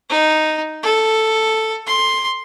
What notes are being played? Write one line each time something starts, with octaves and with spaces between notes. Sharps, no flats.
D#4
A4
C6